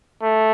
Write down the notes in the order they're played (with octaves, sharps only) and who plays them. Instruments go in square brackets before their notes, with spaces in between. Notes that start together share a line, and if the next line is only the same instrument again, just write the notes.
[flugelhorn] A3